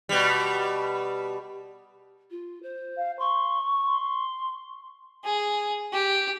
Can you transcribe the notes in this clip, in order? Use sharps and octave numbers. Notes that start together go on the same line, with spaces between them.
B2 G3
F4
C5
F5
C6 C#6
C6
G#4
G4